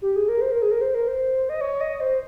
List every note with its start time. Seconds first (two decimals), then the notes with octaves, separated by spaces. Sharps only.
0.02 G4
0.16 G#4
0.29 A#4
0.41 C5
0.52 A#4
0.62 G#4
0.71 A#4
0.81 C5
0.95 A#4
1.08 C5
1.49 D#5
1.61 C#5
1.81 D#5
2.00 C5